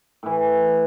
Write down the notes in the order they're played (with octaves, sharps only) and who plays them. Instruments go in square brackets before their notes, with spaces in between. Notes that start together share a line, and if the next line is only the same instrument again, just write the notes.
[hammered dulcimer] A2 E3